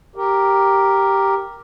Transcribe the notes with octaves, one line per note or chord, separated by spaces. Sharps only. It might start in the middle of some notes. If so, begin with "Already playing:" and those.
G4 A#4